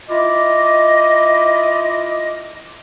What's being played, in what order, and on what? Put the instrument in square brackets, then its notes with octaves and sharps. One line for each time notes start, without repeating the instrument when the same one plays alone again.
[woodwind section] E4 F4 D5 D#5